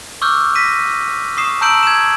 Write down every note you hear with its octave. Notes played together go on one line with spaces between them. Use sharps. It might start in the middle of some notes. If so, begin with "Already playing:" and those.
C#6 D6 E6 F6 G6
A#6 B6 D#7
C#6 D#6 C7 E7
A5 A#5 E6 G6 D7 F#7
G#6 E7